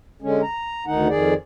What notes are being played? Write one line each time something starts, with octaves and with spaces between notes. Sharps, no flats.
D3 G#3 C#4
A#5
D2 D#3 D#4 F#5
F2 D#3 G#4 D5